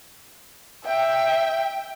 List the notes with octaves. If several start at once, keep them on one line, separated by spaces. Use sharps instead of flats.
E5 G5